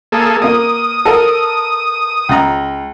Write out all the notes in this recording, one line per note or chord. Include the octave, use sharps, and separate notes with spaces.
A#3 G#4 A4
A#3 A#4 D#6
A4 A#4
C#2 A#5